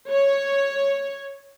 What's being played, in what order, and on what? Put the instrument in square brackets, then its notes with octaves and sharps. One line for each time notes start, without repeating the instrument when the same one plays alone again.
[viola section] C#5